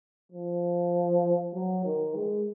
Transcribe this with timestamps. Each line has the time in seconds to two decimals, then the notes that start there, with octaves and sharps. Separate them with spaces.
0.32 F3
1.54 F#3
1.85 D#3
2.15 G#3